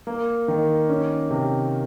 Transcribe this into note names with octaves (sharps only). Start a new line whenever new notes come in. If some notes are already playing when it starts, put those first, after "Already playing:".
A#3
D#3
C#4
C3